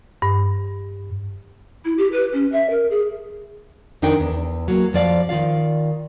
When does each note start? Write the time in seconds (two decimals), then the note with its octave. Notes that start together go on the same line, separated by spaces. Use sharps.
0.22 G2
1.84 E4
1.98 G4
2.12 B4
2.33 C#4
2.52 E5
2.70 A#4
2.90 G#4
4.02 F2 D#3 D4 D#4 A#4 G5
4.20 E2
4.68 F#3 A#3
4.93 F2 F3 D5 F5
5.29 D#3 F4 D5 F5